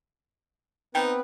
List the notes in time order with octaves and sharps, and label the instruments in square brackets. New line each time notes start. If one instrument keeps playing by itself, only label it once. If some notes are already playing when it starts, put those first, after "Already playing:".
[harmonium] B3 C4 B4 [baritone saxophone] D#4 [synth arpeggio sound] G5